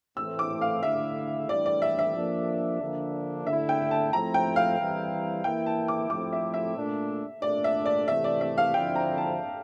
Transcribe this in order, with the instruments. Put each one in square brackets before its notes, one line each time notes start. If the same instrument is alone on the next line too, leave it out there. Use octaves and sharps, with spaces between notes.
[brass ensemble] A2 E3 A3 C4 [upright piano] E6
[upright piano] D6
F5
[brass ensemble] D3 A3 E4 [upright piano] E5
[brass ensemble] A2 E3 G3 D4 [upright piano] D5
[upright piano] D5
E5
E5
[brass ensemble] F3 A#3 D4
D3 F3 A#3 D4
[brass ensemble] D3 A3 E4 [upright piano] E5
[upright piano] G5
A5
[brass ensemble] F3 A3 C4 E4 [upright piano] A#5
[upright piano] G5
F5
[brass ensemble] E3 G3 C4 E4
[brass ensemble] E3 A#3 E4 [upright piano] G5
[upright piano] A5
D6
[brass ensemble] F3 A3 C4 E4 [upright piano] D6
[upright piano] E5
E5
[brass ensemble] A#2 A3 D4
[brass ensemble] A#2 A3 D4 [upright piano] D5
[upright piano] E5
D5
[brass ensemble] C3 E3 A3 [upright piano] E5
[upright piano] D5
E5
F5
[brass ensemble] D3 F3 C4 E4 [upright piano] G5
[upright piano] A#5
A5